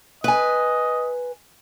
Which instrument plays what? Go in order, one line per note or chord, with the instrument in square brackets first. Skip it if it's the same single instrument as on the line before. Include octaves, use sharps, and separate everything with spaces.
[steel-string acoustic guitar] B4 G#5 [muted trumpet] D#5